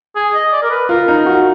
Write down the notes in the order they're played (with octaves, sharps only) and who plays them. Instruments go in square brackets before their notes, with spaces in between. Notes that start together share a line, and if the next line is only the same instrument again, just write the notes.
[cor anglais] G#4
D#5
D5
A#4
B4
[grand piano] F4 [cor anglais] A#4
[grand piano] D#4 [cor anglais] A#4
[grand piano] F#4 [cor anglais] A#4